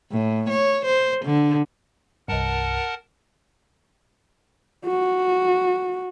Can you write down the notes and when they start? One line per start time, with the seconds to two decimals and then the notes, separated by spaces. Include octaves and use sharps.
0.12 A2
0.49 C#5
0.85 C5
1.25 D3
2.28 C2 G2 A#4 F#5 A5
4.85 F#4